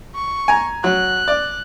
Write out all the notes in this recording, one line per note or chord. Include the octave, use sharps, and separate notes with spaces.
C#6
G#5 A#5
F#3 F#6
D5